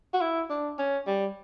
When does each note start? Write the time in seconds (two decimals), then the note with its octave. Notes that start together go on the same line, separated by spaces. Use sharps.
0.13 F#4
0.21 E4
0.50 D4
0.79 C#4
1.07 G3